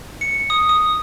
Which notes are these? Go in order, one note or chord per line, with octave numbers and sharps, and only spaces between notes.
C#7
D#6
D#6